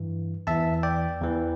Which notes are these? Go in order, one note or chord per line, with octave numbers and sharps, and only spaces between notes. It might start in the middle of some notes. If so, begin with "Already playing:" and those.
Already playing: G2 E3
E2 E3 E5 A5
D5 G5
E2 E3